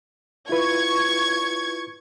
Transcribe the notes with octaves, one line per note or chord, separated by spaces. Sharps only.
E4 F4 B4 C#6 G#6